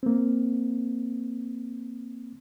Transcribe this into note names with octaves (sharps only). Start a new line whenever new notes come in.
A#3 C4